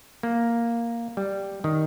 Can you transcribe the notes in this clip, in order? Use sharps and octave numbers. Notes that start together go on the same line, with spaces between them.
A#3
G3
D#3